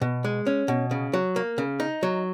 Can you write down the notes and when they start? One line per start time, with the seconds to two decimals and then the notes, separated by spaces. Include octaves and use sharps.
0.01 B2
0.24 G#3
0.46 C#4
0.68 B2
0.91 C#3
1.13 F#3
1.36 A#3
1.58 C#3
1.80 D#4
2.03 F#3